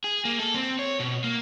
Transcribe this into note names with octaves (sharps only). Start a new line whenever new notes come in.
G#4
A#3
A4
C4
C#5
B2
A#3